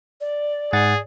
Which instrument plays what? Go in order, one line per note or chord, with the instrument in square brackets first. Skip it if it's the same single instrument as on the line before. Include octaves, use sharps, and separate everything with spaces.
[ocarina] D5
[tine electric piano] G#2 F#5 A6 [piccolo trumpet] G#4